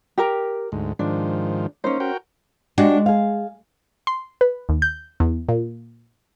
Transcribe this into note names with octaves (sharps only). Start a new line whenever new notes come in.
G4 A#4 A#5
D2 G#2
G#2 D#3 F3 D4
A#3 C#4 D#4 C5
F#4 A#4 G5
G#3 D4 F#4 G4
G#4 F5
C6
B4
D#2
G6
E2
A#2